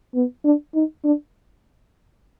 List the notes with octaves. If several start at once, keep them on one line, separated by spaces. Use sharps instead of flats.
B3
D4
D#4
D4